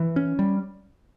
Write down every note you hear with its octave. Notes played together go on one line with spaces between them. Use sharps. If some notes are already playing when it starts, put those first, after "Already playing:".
Already playing: E3
C#4
G3